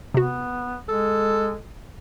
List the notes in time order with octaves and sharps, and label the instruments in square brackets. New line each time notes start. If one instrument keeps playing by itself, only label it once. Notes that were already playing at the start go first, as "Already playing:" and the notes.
[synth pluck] C3 F#4 [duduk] B3
[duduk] G#3 [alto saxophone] A4